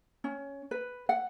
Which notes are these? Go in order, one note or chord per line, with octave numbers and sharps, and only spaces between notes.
C#4
B4
F#5